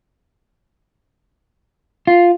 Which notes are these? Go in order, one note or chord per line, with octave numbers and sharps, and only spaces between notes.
F4